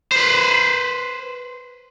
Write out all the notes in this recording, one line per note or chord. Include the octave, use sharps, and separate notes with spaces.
B4 C5